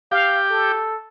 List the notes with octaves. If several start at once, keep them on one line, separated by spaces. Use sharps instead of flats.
G4 F5
A4